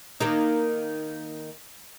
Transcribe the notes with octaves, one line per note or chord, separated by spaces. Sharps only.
D#3 A#3 D#4